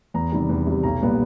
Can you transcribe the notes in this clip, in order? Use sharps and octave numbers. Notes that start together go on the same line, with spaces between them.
E2 A#5
C3 D#3 G3
E2
C3 D#3 G3
B1 A#5
A#2 G3 B3